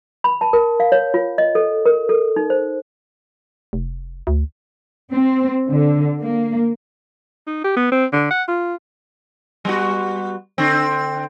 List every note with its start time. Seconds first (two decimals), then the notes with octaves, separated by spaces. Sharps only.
0.24 B5
0.41 A5
0.53 A#4
0.80 F5
0.92 C#5
1.14 F4
1.38 D#5
1.55 A4
1.86 A#4
2.09 A4
2.36 D#4
2.50 C5
3.73 F1
4.27 D2
5.11 C4
5.70 D3
6.22 A#3
7.47 D#4
7.64 G4
7.76 B3
7.92 C4
8.13 D3
8.31 F#5
8.48 F4
9.65 G3 B3 F#4
10.58 D3 C4